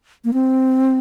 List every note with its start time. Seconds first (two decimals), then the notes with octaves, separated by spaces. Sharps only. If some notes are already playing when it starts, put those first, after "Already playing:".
0.25 A#3
0.33 C4